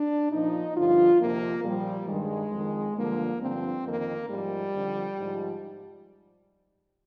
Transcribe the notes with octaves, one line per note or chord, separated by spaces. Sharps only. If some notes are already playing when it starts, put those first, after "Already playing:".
Already playing: D4
A#2 F3 D#4
G2 D3 F3 F4
F2 C3 F3 A#3
A#2 F3 G3
G2 D#3 G#3
F2 D#3
G2 D3 F3 A#3
G2 D3 F3 C4
F2 D#3 A#3
G#2 F3 G3
F2 D3 F3
G#2 F3